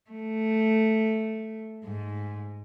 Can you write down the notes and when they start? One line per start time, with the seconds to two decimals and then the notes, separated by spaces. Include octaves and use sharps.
0.11 A3
1.85 G#2